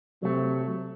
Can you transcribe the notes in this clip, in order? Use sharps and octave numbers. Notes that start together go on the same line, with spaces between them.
C3 F#3 A3